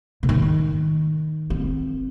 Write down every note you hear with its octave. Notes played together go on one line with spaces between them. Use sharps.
D3
D#3
C4